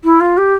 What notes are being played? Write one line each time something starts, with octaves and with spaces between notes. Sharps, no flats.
E4
F4
G4